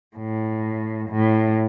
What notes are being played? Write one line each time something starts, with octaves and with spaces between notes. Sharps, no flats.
A2
A2